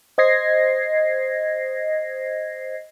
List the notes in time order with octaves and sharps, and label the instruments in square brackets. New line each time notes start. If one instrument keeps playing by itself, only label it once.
[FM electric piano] C5 D#5 G#6 A#6 C7